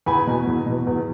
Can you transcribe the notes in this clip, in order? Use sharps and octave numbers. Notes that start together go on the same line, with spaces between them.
E2 G#5 B5
B2
E2
B2
E2